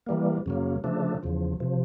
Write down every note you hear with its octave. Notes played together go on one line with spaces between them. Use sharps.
E3 G3 A#3
F#2 C#3 F#3 A#3
C#3 F3 A3 D4
E2 C#3 F3
C3 F3